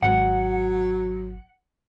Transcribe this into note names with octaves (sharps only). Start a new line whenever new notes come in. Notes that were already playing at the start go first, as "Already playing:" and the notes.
G#1 F#3 F#5